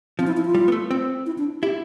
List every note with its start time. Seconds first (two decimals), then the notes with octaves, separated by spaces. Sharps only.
0.19 F3 C4
0.27 E4
0.37 E4
0.46 F4
0.55 G3
0.68 B3
0.72 A3
0.91 C4
1.26 E4
1.38 D4
1.62 E4 G4